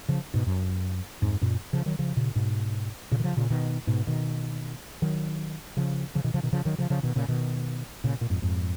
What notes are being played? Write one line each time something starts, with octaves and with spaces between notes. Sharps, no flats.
C#3 F3
G#2 B2
F#2
F2 G#2
F#2 A#2
C#3 F3
D#3 F#3
C#3 F3
A#2 C#3
G#2 B2
A#2 C#3
D#3
C#3 F3
A#2 C#3
B2 D#3
G#2 B2
B2 D#3
D#3 F#3
C#3 F3
C#3 F3
B2 D#3
C#3 F3
B2 D#3
C#3 F3
D#3 F#3
C#3 F3
C#3 F3
B2 D#3
A#2 C#3
B2 D#3
A#2 C#3
A#2
F2 G#2
F2 G#2